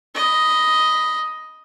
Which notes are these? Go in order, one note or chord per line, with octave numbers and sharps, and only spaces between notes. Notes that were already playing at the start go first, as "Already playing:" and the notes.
D#5 B5